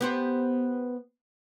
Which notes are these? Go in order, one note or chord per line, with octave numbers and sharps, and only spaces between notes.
B3 G4 C5